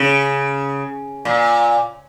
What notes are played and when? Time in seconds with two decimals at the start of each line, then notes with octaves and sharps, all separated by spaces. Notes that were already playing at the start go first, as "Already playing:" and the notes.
Already playing: C#3
1.25 A#2